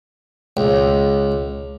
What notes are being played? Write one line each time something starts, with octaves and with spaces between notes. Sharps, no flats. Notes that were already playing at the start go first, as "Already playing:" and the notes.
C#2